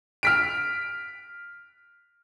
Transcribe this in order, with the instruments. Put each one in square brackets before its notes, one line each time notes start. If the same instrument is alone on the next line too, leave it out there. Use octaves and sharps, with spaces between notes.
[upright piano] F6 B6 D7